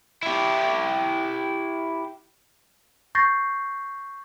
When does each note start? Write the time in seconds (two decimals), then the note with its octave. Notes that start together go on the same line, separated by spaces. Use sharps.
0.23 E4 G4
3.15 C#6 G6 A6 A#6 C7